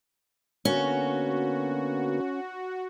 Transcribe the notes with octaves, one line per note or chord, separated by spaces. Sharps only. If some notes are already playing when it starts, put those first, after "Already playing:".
D3 A#3 B3 C#4 F#4